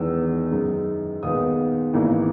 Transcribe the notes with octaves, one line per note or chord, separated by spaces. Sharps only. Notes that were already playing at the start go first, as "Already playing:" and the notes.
Already playing: E2 D#3 G#3 B3 E6
F#2 D#3 G#3
D#2 D#3 G#3 B3 D#6
G#1 G#2 E3 A#3